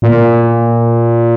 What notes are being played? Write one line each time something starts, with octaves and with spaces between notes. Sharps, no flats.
A#2